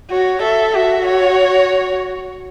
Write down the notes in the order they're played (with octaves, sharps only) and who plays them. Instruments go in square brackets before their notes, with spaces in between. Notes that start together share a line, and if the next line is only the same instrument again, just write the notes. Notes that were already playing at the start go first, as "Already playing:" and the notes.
[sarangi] F#4 [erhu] C#5
[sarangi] A4 [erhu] E5
[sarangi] F#4 [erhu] E5
[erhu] C#5